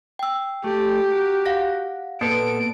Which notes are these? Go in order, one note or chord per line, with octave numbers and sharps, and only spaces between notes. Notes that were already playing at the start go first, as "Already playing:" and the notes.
G5 E6
A3 G4
F#4 A#4
F5 F#5 A#6
A#2 A#3 B3 A4 B4 D7